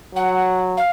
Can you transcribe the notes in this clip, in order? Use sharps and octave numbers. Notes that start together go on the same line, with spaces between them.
F#3 F#5
F5